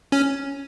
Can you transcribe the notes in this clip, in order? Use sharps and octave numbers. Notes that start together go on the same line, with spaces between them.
C#4